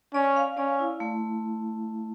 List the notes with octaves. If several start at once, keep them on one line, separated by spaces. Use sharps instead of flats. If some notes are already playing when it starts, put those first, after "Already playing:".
C#4 D5
F5
C#4 D5
E4
A3